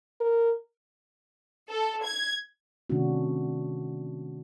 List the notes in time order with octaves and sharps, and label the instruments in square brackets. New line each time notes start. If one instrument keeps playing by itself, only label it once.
[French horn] A#4
[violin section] A4
G#6
[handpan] C3 D#3 A3 C#4 D4 F#4